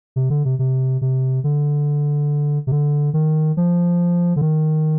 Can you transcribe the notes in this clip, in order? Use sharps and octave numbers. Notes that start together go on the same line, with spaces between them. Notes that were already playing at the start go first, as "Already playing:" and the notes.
C3
D3
C3
C3
C3
D3
C3
D3
D#3
F3
D3
D#3